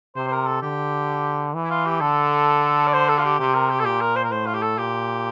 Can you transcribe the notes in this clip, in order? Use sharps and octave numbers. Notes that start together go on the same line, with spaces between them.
C3 C5
C5
A#4
A4
D3 G4
E3
E4
F4
G4
D3 A4
D5
C5
A4
F4
G4
C3 G4
A#4
G4
A4
A#2 G4
A#4
C5
A#4
A2 C5
F4
G4
A4
A#2 G4